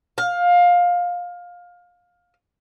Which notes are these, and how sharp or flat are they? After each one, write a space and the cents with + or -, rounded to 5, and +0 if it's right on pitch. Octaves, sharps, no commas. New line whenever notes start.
F5 +20